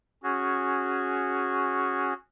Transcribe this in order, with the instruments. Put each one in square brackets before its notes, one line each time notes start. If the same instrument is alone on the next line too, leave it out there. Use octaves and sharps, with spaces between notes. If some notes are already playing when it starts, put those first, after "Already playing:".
[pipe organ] C#4 F#4 G#4